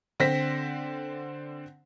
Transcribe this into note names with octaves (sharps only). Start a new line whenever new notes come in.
D3 C4 C5 A#6 B6